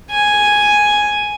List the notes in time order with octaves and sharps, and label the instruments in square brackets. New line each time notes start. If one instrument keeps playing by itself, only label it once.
[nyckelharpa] G#5